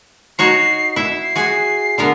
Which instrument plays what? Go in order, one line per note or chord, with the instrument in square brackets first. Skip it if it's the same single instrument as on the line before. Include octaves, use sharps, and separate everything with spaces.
[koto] D#4 F#4 C#5 [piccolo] C7
[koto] E4 E5
[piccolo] C7
[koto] F#4 G#4 G#5
D3 B3 A#4